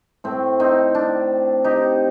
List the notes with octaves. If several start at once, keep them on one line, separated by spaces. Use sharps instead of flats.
A2 A3 C4
C4 D#4
D4
D#4 G4